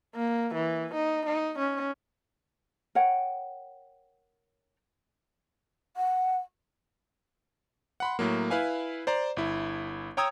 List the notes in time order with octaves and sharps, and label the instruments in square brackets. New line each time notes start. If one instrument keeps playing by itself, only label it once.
[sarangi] A#3
E3
D#4
D#4
C#4
[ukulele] A#4 C#5 F#5 G5
[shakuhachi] F#5
[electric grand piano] F#5 B5 C6
A2 F#3 A#3
E4 B4 F5 G#5
C5 D5 A#5
G1 E4
C#5 G5 A#5 D#6 E6 G#6